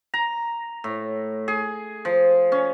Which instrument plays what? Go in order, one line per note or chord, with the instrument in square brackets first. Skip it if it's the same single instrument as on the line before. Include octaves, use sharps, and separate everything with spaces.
[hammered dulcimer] A#5
A2
G#4
F3
C#4